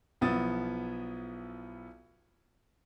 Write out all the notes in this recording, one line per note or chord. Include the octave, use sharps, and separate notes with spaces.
B1 F3 B3 E4 D#6 A6